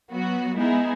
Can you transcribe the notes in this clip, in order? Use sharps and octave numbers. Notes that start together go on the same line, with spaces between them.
F#3 B3 F#4
G#3 B3 D#4 E4 G#4